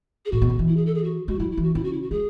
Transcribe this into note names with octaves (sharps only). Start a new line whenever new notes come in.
G#4
A2 F#4
B2
D3
E3
E4
G#4
A4
G#4
F#4
G#3 F#4
F#3 E4
E4
E3
F#4
C#3 E4
F#4
E4
F#4
G#3 G#4